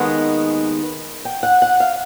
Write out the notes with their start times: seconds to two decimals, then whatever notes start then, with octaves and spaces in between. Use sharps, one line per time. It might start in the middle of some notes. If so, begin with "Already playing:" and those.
Already playing: D#2 D#3 G#3 B3 F#5
1.25 G5
1.43 F#5
1.62 F#5
1.80 F5